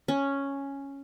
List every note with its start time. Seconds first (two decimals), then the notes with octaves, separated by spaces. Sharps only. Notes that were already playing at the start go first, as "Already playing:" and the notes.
0.08 C#4